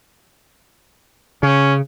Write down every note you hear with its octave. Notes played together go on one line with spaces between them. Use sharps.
C#3 C#4